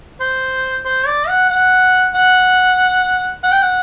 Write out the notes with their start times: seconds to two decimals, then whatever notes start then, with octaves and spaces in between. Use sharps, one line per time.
0.21 C5
0.85 C5
1.07 D5
1.28 F#5
1.50 F#5
2.14 F#5
3.43 F#5
3.52 G5
3.62 F#5